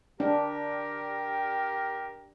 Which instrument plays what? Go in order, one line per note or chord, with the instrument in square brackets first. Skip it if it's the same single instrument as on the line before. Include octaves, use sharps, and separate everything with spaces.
[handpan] D4 [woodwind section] G4 A#4